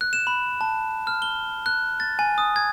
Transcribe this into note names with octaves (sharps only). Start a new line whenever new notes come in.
F#6
E7
B5
A5
F6
G7
F#6
A6
G#5
D#6
G#6